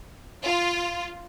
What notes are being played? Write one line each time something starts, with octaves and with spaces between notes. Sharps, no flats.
F4